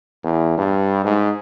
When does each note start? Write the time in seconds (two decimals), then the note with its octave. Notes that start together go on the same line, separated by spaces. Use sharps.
0.24 E2
0.58 G2
1.04 G#2